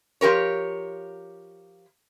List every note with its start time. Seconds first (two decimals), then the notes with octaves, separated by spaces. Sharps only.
0.21 F3 G4 A#4 C#5